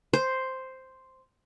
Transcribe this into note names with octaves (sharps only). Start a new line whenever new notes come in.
C5